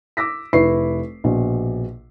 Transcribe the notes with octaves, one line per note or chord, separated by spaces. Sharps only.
D6 E6 A#6 B6
F1 E4 B4 C#6 C7
A#1 B2